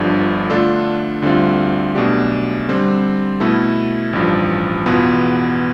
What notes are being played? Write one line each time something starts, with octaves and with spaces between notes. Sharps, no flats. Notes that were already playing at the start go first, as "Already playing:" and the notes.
Already playing: G1 G2 D3 F3
D3 A3 D4 F4 A4
D2 D3 G3 C4 F4
B1 B2 A3 D4 G4
D3 G3 C4
B2 A3 E4 A4
A1 G2 F3
E2 B2 B3 F4